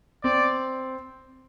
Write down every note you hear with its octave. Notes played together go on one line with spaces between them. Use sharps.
C4 D5